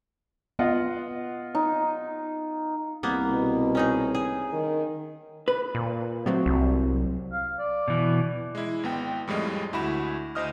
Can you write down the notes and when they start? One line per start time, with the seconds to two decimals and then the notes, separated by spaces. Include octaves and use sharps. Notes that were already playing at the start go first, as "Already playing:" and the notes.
0.59 B3 F4 D#5 F#5
1.55 D#4
3.03 C2 A#3 B3
3.32 B2
3.75 C#4 D#4 G#4
4.14 G#4
4.53 D#3
5.48 B4
5.75 A#2
6.26 A2 F#3 C4
6.46 C2
7.32 F5
7.59 D5
7.88 B2 E3
8.55 G#3 E4
8.83 G#1 B3 G5
9.27 F2 A2 G3 G#3
9.73 D2 E4 F#4 B5 E7
10.35 D2 C5 D#5 D#6 F6